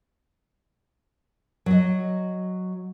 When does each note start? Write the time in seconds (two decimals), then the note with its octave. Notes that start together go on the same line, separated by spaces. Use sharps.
1.66 F#3 D#5